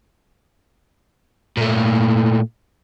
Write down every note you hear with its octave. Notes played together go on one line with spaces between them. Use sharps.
A#2 A3